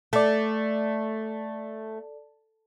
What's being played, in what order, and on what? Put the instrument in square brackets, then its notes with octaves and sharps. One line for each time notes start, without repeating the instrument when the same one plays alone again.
[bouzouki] A3 [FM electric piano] A4 D5